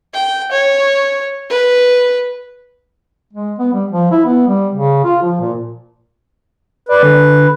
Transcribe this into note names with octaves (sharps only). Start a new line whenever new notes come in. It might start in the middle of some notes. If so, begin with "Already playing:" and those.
G5
C#5
B4
G#3
B3
G3
F3
E4
B3
G3
C#3
F4
F3
A#2
B4 D5
D3